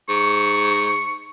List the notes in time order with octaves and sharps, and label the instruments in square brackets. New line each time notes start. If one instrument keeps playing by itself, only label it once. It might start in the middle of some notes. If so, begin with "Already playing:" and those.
[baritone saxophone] G#2 [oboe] C#6